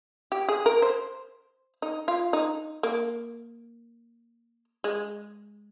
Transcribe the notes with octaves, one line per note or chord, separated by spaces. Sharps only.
G4
G#4
A#4
C5
D#4
F4
D#4
A#3
G#3